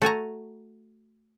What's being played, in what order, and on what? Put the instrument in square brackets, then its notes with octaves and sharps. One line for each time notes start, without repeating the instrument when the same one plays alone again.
[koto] A3 F#4 G#5 A#5